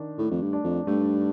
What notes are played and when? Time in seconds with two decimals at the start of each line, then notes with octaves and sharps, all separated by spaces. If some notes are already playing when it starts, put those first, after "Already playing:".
Already playing: D#3 D4
0.18 A2 A3
0.31 F2
0.42 G2
0.53 D4
0.64 F2
0.87 G2 A3